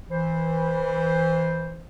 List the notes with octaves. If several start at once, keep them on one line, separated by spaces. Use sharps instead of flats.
E3 C5